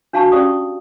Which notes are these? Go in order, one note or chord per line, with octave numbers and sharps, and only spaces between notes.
D4 F#4 F5 A5 B5 C#6
C#4 G4 D5 F5 C#6 D#6